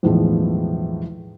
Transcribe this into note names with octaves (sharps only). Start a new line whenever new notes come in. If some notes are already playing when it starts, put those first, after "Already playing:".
B1 E2 A2 E3 F3 G#3